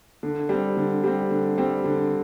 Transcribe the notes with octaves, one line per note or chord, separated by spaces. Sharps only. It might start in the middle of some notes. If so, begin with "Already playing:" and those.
D3
G3 C4
D3
G3 C4
D3
G3 C4
D3